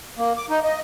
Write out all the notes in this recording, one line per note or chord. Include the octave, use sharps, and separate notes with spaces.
A#3
D6
D#4
D#5